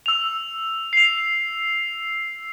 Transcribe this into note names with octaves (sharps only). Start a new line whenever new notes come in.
E6 F7
C7 F7